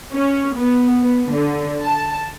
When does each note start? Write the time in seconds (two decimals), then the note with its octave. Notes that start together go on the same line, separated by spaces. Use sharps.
0.14 C#4
0.56 B3
1.02 B3
1.32 D3
1.83 A5